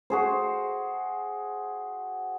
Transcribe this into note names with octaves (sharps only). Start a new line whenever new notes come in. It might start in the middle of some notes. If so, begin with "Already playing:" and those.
F#4 G#4 C5